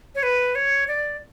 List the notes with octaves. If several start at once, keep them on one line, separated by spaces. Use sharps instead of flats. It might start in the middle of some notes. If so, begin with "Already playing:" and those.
C#5
B4
C#5
D5